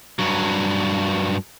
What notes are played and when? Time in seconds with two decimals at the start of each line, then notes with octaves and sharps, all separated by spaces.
0.19 G2 F#3